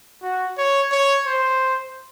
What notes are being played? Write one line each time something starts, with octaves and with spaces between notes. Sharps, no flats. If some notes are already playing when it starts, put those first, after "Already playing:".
F#4
C#5
C#5
C5